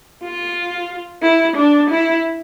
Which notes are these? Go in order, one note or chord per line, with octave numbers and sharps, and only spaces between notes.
F4
E4
D4
E4